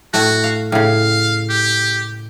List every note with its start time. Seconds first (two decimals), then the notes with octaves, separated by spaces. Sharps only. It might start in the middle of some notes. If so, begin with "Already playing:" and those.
0.14 A2 A3 F#4
0.44 F5
0.72 A2 C#3 F5
1.49 G4